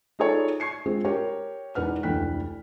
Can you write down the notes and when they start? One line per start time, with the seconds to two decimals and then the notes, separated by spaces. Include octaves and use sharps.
0.19 D#4 F4 G#4 A4 C#5 D5
0.60 C#6 G#6 C7 C#7
0.86 G#3 C4 F4 G#4
1.05 G4 A#4 C#5
1.75 E1 E2 D#4 B4 F#5 F6
2.03 F1 D2 E3 G5 F#6 B6